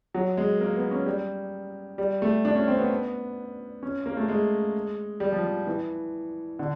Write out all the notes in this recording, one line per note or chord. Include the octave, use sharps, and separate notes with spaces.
F#3
G#3
A#3
B3
C#4
G3
G3
A3
D4
C#4
C4
B3
C#4
A#3
A3
G#3
G3
F3
F3
E3
D3